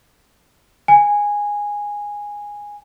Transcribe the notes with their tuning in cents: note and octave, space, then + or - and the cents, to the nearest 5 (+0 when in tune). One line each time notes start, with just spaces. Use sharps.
G#5 -10